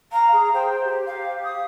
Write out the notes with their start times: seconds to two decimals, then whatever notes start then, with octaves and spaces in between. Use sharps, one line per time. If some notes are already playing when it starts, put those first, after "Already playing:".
0.12 F5 A#5
0.33 G#4
0.54 C5 G5
0.84 G4
1.06 F5
1.44 D#6